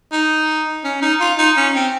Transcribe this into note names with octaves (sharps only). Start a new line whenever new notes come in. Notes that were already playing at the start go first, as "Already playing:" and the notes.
D#4
C#4
D#4
F4
D#4
C#4
C4